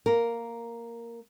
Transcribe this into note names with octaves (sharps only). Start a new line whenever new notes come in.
A#3 A#4